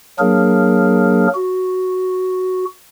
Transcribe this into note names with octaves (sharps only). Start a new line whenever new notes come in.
F#3 A#3 D4 G#4 A#4
F#4